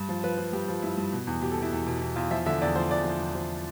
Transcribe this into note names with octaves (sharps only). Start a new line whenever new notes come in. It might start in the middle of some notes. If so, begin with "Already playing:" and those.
Already playing: G2
F3
F3 B4
F3
G2 G4
F3
G2 E4
G2
B2
E2
B2 G4
A4
B2 E4
E2
B2
E2
E2 F4
F3 E5
D3 E5
E2 D5
F3 C5
E2 D5
F3
E2
F3